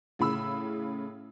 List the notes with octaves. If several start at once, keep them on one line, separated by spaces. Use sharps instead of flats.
A2 C#3 B5 E6